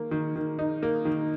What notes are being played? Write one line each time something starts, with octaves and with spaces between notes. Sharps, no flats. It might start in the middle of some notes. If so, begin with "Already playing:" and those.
Already playing: D#3 A#3
D#3
D#3
D#4
A#3
D#3